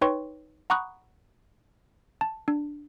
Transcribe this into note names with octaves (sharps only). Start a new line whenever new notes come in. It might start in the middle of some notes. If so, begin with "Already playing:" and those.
D#4 B4 C#5 G5 C6 C#6
F#5 A#5 B5 C#6 D#6 F#6
A5
D4